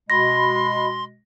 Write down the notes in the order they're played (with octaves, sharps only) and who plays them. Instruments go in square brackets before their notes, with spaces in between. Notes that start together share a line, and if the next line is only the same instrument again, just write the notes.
[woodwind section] B2 G#3 [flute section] F#4 D#5 B5 [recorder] C6 [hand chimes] A#6